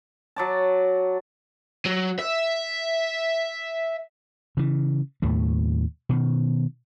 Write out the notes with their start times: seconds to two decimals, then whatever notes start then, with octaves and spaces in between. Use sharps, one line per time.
0.36 F#3 D5 A5
1.86 F#3
2.19 E5
4.57 C#3 E3
5.22 D#2 A2 A3
6.09 B2 D#3